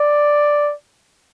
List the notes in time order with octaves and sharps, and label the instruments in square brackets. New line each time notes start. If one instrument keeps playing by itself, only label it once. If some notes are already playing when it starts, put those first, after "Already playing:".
Already playing: [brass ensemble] D5